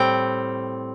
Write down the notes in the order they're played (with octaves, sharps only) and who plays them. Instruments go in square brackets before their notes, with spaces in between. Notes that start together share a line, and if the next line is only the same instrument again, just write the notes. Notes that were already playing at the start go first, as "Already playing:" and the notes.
Already playing: [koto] A2 G3 C4 G5